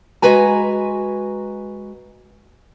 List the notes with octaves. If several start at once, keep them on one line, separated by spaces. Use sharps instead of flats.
G#3 F#4 B4 G#5 A#5